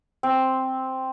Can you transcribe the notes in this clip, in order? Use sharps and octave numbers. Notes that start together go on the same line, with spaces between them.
C4